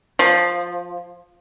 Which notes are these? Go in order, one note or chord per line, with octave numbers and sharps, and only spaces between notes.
F3